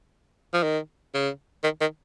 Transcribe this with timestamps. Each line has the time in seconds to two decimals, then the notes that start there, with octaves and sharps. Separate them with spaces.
0.54 F3
0.63 D#3
1.14 C#3
1.64 D#3
1.81 D#3